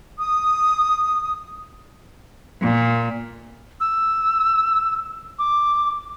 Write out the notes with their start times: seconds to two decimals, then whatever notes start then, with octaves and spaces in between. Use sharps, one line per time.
0.18 D#6
2.61 A#2
3.80 E6
5.39 D6